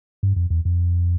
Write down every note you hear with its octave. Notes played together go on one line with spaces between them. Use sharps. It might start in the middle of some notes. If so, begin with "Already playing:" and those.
G2
F2
E2
F2